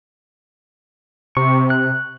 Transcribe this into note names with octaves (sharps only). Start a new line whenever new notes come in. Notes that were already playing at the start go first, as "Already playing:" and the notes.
C3 C#6
F#6